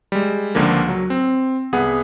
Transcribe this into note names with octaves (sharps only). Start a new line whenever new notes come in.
G3 G#3
C#2 D3 F3 A#3
F#3
C4
C2 B3 G#4 F#5